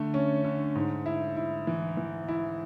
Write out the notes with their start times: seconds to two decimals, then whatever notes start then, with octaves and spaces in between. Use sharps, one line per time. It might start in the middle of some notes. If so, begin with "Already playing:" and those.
Already playing: D3 A3
0.14 C#4
0.45 D3
0.75 G#2
1.06 E4
1.37 E4
1.67 E3
1.97 E3
2.28 E4